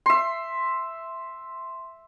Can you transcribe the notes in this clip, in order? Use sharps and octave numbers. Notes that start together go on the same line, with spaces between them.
E5 C6